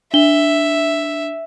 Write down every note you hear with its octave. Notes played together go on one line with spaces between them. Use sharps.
D4 E5 G7